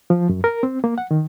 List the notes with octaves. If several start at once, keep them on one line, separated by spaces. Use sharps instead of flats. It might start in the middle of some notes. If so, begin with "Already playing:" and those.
F3
F#2
A#4
C4
A#3
F#5
D#3